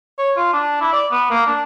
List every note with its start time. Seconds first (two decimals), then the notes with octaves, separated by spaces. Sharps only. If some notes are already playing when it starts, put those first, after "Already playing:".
0.18 C#5
0.37 F4
0.53 D4
0.81 E4
0.93 D5
1.11 B3
1.30 A#3
1.47 D4